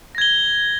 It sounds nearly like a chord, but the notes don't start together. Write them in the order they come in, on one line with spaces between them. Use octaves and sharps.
A#6 G#6 G7